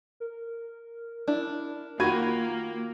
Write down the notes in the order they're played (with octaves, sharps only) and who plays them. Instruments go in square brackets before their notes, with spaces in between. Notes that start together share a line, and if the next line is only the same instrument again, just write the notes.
[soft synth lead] A#4
[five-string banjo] D4 E4
[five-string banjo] D#3 F4 B5 [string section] A#3 [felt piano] F#4 G#6 D#7